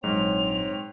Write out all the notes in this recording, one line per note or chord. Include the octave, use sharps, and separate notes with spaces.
A#1 G#2 F#3 G#3 C4 C#5 F7